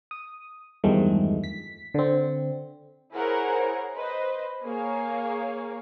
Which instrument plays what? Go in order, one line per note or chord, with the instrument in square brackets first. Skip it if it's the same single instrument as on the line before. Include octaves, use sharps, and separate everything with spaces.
[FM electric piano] D#6
E2 G2 D#3 F3 G#3 A3
B6
D3 C4
[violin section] E4 G#4 A#4 C5 C#5 F#5
B4 C5 D#5
A#3 G#4 C#5 F5